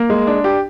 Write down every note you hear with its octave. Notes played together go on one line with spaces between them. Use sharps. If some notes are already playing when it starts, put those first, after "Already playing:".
Already playing: A#3
G#3
D4
G4